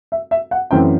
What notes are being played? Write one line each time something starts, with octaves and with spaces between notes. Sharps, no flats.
E5
E5
F#5
F#2 E3 A3 C4 G5